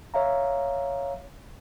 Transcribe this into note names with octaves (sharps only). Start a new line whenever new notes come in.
C#5 E5 F5 A#5